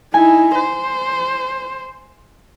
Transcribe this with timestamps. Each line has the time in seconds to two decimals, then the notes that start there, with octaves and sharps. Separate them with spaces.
0.14 D#4 E4 G#5
0.55 C5